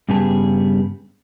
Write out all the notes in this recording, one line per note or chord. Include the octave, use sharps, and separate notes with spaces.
G2 C#3 G3 B3 G#4 A5